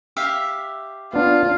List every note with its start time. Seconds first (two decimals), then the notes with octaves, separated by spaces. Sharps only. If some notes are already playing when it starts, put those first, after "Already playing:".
0.17 G4 E5 F5
1.13 B3 D4 F4